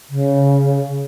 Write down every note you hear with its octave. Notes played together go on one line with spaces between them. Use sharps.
C#3